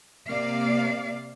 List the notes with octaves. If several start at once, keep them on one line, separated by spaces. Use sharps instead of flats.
C3 A#3 D5 F5